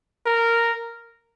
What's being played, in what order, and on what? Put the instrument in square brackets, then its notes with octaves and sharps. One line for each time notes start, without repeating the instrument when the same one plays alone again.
[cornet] A#4